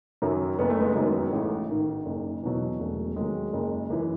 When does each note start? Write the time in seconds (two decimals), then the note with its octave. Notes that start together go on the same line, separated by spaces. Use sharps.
0.22 F#2 D#3 F#3
0.59 F#1 B3
0.70 A3
0.80 G#3 B3
0.96 F#2 D#3 F#3 G#3 B3
1.33 A1
1.70 G#2 D#3
2.06 F#1
2.43 E2 B2 F#3
2.79 E1 F#3 A3
3.16 D#2 D#3 F#3 G#3
3.53 F#1
3.90 F#2 E3